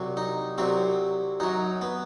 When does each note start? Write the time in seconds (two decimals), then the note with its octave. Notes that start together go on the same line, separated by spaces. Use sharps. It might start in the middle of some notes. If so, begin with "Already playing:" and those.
Already playing: C2 C3 F#3
0.17 D#4
0.58 C2 C3 F#3 C4
1.40 F#2 F#3 D#4
1.81 B3